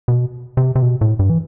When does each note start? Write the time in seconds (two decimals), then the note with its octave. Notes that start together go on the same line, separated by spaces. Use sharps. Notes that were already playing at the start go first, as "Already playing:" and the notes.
0.08 B2
0.57 C3
0.76 C3
0.82 B2
1.01 A2
1.19 G2
1.30 E3